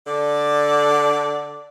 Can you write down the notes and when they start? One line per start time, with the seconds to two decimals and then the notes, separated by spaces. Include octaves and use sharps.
0.07 D3 A4 D5